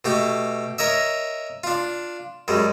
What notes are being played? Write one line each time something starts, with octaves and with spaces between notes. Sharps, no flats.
B2 A3 G4
A#4 C#5 D#5 E5
D4 F4
F#2 G3 G#3